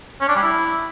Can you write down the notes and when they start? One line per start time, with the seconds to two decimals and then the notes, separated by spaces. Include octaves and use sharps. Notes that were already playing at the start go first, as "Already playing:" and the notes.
0.21 C#4
0.28 D4
0.36 G3
0.43 E4